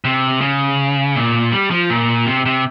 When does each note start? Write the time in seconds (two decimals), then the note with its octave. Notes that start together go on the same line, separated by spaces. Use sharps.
0.05 C3
0.41 C#3
1.15 A#2
1.52 G3
1.71 F3
1.90 A#2
2.26 C3
2.46 C3